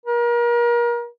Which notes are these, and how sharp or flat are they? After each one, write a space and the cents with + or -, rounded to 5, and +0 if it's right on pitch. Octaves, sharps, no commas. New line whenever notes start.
A#4 +35